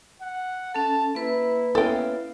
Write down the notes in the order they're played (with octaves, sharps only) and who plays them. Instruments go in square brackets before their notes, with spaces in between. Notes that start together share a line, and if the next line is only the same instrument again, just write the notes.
[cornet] F#5
[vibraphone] C#4 A4 [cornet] A5
[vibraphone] A#3 B4 [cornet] E4
[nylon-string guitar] B3 C#4 E4 [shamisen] A4 G5 [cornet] F5